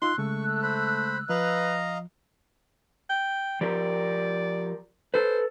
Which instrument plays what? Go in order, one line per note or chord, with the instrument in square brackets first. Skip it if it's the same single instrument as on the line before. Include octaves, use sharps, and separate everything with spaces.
[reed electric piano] D#4 F4 [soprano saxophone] C6 [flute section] E6 F#6
[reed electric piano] C#3 G#3 [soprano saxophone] A3 [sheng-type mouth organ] C#6
[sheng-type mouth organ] C5 B5
[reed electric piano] F3 [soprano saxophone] B4 [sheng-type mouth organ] D#5 F5 A#5
[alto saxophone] G5
[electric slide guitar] F3 G4 A#4 [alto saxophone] D5
[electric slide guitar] A4 B4 [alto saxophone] C5